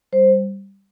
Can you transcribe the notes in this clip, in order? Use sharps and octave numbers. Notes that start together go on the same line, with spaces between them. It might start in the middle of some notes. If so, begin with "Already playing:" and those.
G3 C5